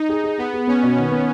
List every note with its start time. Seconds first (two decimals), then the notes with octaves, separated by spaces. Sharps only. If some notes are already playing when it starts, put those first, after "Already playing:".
Already playing: D#4
0.09 G#4
0.24 G#4
0.38 B3 G#4
0.54 G#4
0.67 B3 C#4
0.83 B2
0.97 D#3
1.12 B3